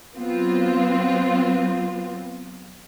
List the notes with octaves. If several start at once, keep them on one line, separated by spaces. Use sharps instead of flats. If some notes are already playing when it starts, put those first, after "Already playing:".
F#3 B3 C4 F4